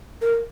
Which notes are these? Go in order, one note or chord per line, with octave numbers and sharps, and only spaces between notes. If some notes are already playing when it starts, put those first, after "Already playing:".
A#4